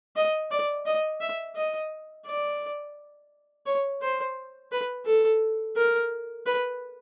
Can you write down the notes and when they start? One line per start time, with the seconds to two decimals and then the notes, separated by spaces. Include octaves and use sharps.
0.16 D#5
0.51 D5
0.86 D#5
1.21 E5
1.55 D#5
2.26 D5
3.66 C#5
4.02 C5
4.72 B4
5.06 A4
5.76 A#4
6.46 B4